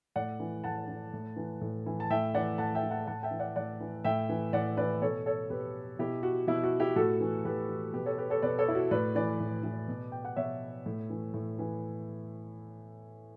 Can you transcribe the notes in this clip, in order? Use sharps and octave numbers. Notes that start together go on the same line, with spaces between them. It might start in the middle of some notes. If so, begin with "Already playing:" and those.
A2 D5 F#5
E3
A2 F#5 A5
E3
A2
E3
A2
E3
A5
A2 E5 G5
E3 D5 F#5
A2 F#5 A5
E5 G5
E3
F#5 A5
A2 F#5 A5
E5 G5
E3
D5 F#5
A2 D5 F#5
E3
A2 E5 G5
E3
A2 D5 F#5
E3 B4 D5
B2 A4 C#5
A4 C#5
B2 G4 B4
B2 E4 G4
F#4
B2 E4
F#4
E4 G4
A2 F#4 A4
E3
A2 G4 B4
E3
B2 G4 B4
A4 C#5
G4 B4
A4 C#5
B2 B4 D5
A4 C#5
E4
F#4
A2 B4 D5
E3 B4 D5
A2
E3
B2
G5
F#5
B2 C#5 E5
A2
E3
A2
E3